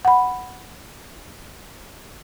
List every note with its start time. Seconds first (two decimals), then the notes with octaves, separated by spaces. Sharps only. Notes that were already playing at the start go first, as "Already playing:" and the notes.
0.05 F#5 B5